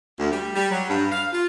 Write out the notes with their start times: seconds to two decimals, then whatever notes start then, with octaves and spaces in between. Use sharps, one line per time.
0.19 D2
0.32 G3
0.55 G3
0.71 F#3
0.89 G2
1.12 F5
1.33 F4